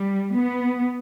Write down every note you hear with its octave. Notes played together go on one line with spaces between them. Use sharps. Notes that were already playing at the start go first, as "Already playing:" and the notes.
Already playing: G3
B3